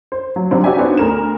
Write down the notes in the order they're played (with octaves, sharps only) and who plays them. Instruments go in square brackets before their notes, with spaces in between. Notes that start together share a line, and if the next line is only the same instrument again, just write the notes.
[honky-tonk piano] C5
F#3
C3 F#3 G3 C4 D4
D4 F#4 G4 D5 E5 G#5
B3 D4 D#4 F#4 C5 C#5
D2 A#4 E7